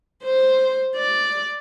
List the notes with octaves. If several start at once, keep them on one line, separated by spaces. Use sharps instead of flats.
C5
D5